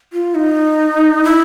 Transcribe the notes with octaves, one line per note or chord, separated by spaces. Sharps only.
F4
D#4
E4